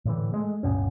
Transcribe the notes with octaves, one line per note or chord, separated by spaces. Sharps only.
A2 D3 E3
G#3 A3
D1 G2 B2 C#4